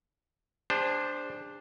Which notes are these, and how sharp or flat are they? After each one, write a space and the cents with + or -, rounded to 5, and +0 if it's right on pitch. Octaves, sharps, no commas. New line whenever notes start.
D4 +0 G#4 -40 C5 +0